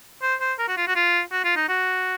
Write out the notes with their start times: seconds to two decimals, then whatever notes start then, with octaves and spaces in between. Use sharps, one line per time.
0.22 C5
0.41 C5
0.59 A#4
0.68 F#4
0.77 F4
0.88 F#4
0.96 F4
1.32 F#4
1.44 F4
1.56 D#4
1.69 F#4